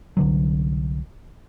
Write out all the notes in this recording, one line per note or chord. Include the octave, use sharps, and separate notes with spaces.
C2 D3 F#3